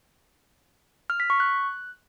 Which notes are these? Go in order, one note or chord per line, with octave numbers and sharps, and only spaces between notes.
F6
B6
C#6
F#6